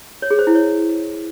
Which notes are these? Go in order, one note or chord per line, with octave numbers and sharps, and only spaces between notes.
C#5
G#4
C5
E4
C#5